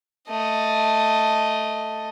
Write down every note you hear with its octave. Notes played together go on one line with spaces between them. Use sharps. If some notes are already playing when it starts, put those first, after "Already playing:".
A3 D#5